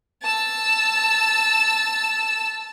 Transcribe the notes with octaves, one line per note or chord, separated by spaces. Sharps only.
A5 E6